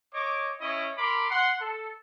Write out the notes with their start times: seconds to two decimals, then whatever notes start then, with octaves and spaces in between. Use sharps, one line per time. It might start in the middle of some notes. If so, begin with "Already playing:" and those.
0.14 C#5 D#5 D6
0.61 C#4 E4 C#5 D#5
0.98 A#4 B5 C6 D6
1.30 F#5 C6
1.61 A4